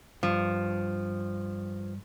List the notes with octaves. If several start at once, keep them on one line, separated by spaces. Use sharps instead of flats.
G2 F3